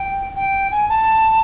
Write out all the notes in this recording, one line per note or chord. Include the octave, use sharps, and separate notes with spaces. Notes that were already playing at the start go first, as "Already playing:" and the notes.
Already playing: G5
G5
G#5
A5